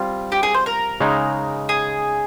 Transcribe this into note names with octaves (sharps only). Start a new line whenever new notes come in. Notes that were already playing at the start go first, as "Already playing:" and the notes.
Already playing: G3 C4 F4
G4
G#4
C5
A#4
C#3 G#3 D#4
G#4